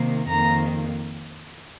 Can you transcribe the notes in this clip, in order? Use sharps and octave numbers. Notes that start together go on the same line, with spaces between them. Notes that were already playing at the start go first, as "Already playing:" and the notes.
Already playing: C3 D#3 A#3
F2 D#3 A#3 A#5